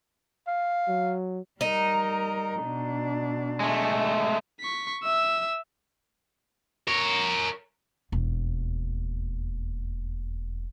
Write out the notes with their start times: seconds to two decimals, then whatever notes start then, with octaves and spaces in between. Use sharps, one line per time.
0.48 F5
0.88 F#3
1.61 G3 D#4 A#4
2.62 B2 D4
3.60 G#3 A3
4.60 C#6 B6
5.03 E5 E6
6.88 A#4 C#5
8.12 E1 D#2